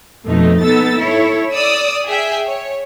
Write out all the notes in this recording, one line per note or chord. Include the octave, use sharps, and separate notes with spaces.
F2 B2 A3 D#4
B3 D#4 A4 E6 A6
E4 A4 C#5
D5 D#6 E6
G#4 E5 G5
C#5